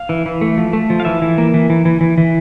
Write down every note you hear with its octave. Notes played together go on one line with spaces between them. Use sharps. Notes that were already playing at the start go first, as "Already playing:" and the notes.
Already playing: F5
E3
E3
A3
F3
A3
F3
F5
E3 E5
E3
A#3
E3
E3
E3
E3
E3